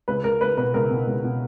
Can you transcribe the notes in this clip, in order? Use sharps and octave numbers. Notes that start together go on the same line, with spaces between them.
C#2 B4
C#2 A#4
C#2 B4
B2 B4
C#2 A#4
B2
C#2
B2